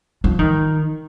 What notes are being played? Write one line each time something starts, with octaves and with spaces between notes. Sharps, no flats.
F3
D#3